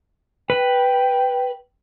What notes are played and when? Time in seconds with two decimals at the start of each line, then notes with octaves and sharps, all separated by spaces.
0.50 B4 G5